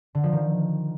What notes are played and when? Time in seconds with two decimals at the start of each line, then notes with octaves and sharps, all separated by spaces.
0.15 D3
0.23 F3
0.32 D#3